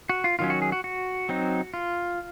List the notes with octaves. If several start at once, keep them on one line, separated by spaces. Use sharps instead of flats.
F#4
F4
D#3 F#3 C#4 F4
F#4
G#4
F#4
F#4
F#3 C4 D#4
F4